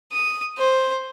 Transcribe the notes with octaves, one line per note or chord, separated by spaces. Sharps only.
D#6
C5